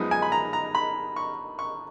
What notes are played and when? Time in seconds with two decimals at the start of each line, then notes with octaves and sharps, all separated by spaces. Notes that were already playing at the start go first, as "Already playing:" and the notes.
Already playing: F#2 F3 G#3 B3 D#4
0.11 G#5
0.22 B5
0.32 A#5
0.53 A#5
0.75 B5
1.16 C#6
1.59 C#6